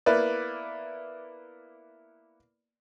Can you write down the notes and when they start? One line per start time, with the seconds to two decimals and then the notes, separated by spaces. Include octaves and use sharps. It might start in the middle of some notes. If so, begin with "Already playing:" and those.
0.06 A#3 B3 E4 B4 D5